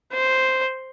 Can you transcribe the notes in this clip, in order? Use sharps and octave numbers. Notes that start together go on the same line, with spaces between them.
C5